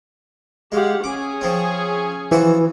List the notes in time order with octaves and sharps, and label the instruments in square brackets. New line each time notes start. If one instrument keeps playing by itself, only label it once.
[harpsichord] G#3 [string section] G4 F5 F#5
[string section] C#4 G#4 [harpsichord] D6
[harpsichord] F3 C4
[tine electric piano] E3 [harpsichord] F3 F#4 C#6